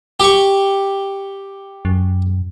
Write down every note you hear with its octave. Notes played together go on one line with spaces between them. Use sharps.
G4 C#6
F#2